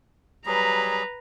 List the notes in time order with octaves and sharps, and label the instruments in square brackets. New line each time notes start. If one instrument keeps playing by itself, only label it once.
[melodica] F#3 G3 G#4 [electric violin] B4 A#5